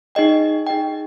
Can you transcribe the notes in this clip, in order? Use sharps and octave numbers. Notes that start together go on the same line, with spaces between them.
D#4 G#4 D#5 G5
D#4 G#4 D#5 G5